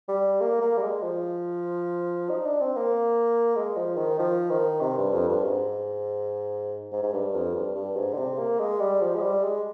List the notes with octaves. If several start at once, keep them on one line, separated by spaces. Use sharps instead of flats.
G3
A#3
A#3
G3
G#3
F3
D#4
D4
C4
A#3
G#3
F3
D#3
F3
D#3
C3
G2
F2
G2
G#2
G#2
G#2
G2
F2
G2
G2
G#2
D3
C3
A#3
G#3
G3
F3
G#3
G3
G#3